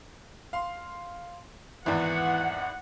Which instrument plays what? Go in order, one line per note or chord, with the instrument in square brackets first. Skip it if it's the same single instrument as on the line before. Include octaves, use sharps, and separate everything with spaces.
[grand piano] F5 C6
[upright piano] G#1 E2 [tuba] E3 [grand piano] E4 D5 [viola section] F#5